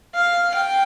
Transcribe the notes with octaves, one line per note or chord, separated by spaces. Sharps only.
F5
G5